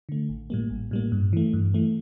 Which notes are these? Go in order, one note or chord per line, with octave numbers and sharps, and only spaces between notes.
D3 A3
A1
A2 G3 A#3
A1
A2 G3 A#3
G2
E3 A3
G2
E3 A3